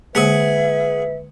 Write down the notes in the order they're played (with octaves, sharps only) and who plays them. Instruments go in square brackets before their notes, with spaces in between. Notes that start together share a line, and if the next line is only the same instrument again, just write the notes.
[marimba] D3 G#3 A#3 [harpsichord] G#4 F#5 [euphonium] B4 [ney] E5